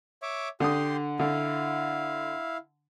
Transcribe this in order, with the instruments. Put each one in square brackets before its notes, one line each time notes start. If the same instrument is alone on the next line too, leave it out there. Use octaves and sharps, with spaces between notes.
[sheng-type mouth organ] C#5 E5 D6
[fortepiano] D3 D#6 [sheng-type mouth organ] G4 C6
[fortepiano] D3 [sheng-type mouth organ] E4 F5